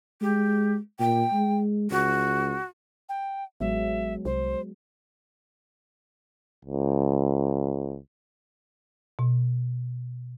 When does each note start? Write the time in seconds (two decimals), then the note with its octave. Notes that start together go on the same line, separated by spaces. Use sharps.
0.22 G#3 G4
1.00 A#2 G5
1.33 G#3
1.91 C#2 F#4
3.09 G5
3.61 A1 F#3 G#3 B3 E5
4.25 C2 C5
6.65 C#2
9.19 B2